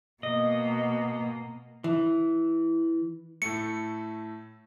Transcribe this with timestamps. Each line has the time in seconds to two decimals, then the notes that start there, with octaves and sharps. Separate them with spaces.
0.23 B2 A#3 D#5
1.84 E3
3.42 A2 A3 C#7